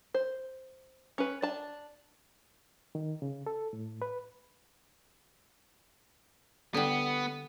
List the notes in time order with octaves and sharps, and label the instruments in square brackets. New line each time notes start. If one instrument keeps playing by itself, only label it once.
[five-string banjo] C5
C#4 B4
D4 A5
[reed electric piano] D#3
C#3
A4
A2
B4
[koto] D3 G3 [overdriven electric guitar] B3